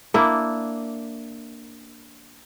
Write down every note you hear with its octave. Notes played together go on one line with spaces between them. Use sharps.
A#3 D4 E4